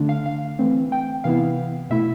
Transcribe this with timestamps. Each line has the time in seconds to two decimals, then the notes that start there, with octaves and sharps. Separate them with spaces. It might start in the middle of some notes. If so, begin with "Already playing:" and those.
Already playing: D3 A3 D4
0.09 F5
0.26 F5
0.59 E3 A3 C4
0.92 G5
1.24 C3 E3 B3 E4 F5
1.90 B2 A3 E4 E5